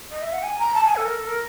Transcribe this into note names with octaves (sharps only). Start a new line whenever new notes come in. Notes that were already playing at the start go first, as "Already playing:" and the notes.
D#5
E5
F#5
G#5
A#5
A5
G#5
A4
A#4
A4
A#4